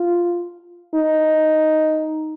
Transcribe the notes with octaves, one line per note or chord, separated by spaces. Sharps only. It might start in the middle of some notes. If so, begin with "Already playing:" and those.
Already playing: F4
D#4